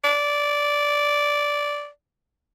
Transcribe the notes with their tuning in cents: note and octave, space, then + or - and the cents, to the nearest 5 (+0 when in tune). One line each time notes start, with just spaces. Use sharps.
D5 -10